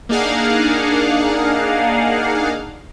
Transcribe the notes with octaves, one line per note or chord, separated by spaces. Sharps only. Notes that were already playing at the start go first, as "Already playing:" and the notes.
A#3 D4 D#4 G#4 F5 F#5